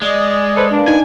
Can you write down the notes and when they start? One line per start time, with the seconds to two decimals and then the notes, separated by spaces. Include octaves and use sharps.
0.02 G#3 D5 D#5
0.56 A4 B4 C5
0.71 A#3 D4 B4
0.88 D#4 G#5